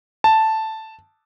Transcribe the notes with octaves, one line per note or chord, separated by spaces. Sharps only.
A5